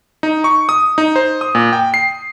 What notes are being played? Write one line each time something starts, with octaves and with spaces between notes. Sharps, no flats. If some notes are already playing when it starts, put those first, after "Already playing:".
D#4
C#6
D#6
D#4
C5
D#6
A#2
G5
C7